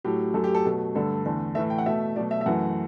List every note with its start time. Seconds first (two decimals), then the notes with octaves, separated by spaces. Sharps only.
0.04 A2 F#3 A3 G4
0.34 F#2 F#3 A3 A4
0.44 G4
0.55 A4
0.65 B2 F#3 A3
0.95 G2 D3 A3 A4
1.25 E2 D3 A3
1.55 A2 E3 A3 E5
1.70 G5
1.78 F#5
1.86 B2 A3 E5
2.16 B2 F#3 A3 D5
2.31 E5
2.41 E5
2.46 F#2 E3 A3 F#5